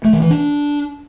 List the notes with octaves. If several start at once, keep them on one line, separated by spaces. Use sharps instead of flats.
A3
D#3
E3
D4